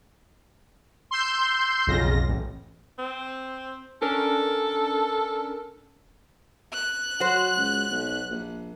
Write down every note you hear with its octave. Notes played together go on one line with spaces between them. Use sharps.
C6 E6 G6
B1 F2 C#3 F4 A#6
A1
C4
C#4 D4 A4 A#4
F#6
F#3 F#4 C5
C#2
B1
A#1